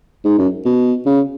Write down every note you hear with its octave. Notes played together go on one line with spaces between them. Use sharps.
G#2
F#2
B2
C#3